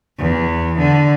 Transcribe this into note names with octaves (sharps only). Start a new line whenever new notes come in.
E2
D3